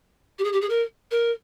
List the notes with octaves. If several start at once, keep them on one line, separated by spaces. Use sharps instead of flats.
G4
G#4
G4
G#4
A#4
A#4